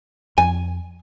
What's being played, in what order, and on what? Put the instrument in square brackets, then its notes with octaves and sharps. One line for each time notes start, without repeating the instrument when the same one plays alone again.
[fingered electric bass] F2 [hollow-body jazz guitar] G#5